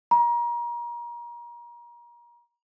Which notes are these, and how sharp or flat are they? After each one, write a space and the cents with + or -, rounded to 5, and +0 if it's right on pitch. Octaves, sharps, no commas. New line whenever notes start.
A#5 +30